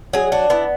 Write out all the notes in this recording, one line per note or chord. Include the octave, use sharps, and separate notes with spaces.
F#3 G#4
D4 F#4
B3 E4